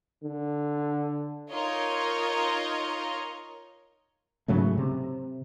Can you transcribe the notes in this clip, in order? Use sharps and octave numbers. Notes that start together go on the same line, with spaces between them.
D3
D#4 F4 A#4 C#5 D#5
G#2 C#3 F#3 A3
C3